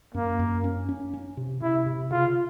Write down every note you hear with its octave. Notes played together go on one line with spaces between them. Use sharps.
F#2 A#3
F#2
C#4
C#4
C#4
C3
C3 E4
C3
C#3 F4